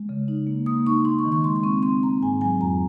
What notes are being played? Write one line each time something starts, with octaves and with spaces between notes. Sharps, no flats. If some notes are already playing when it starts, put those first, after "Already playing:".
Already playing: G#3
C#3
D#4
A#3
A#3 D#6
D#4 C#6
D#4 C6
C#6
D#3
C#6
G#3 C6
C6
C4 C#6
C4 C6
C4 A#5
G#2 G#5
F#3 G#5
F2 A#5